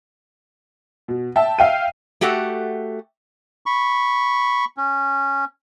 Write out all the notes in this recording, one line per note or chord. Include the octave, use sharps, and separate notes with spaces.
B2
E5 G5 A5
E5 F5 G5 D#7
A3 F#4 G4 A4 F#5
B5 C#6
C#4